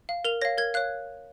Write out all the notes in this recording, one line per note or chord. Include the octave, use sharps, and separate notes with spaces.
F5
A#4 F7
C#5 F5 A#6
A#4 G#6
C#5 F5 F#6